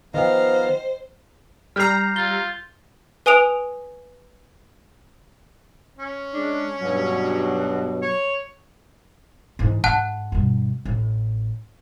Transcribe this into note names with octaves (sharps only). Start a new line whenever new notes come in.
D#3 F3 B3 C5 D#5 F5 G5 A#5
G3 A#5 F6 G6 C7
F4 G7
B4 G#5 D#6 D7 F7
C#4
G#3 D4
G2 B2 F#3
C#5
G#2 E3
G#2 F#5 A5 F#6
G2 B2
A1